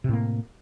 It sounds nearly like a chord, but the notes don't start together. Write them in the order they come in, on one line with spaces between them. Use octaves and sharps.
C3 A2 A#3